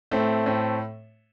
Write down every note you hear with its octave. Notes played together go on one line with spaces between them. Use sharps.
A2 A3 C4
A2 A3 C4